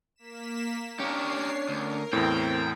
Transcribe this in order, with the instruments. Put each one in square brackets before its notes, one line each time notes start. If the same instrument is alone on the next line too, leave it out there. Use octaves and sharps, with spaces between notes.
[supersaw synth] A#3 B6 E7
[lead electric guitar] C#4 D4 [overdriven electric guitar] G4 A#4 [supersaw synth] C#5 C7
[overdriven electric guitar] D2 [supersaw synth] A#4
[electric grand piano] E2 A2 [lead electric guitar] C4 [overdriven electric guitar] G5